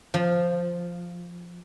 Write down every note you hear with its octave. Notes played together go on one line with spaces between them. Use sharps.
F3